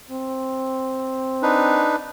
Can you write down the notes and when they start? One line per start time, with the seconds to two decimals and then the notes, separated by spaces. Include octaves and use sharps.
0.11 C4
1.42 D4 D#4 B4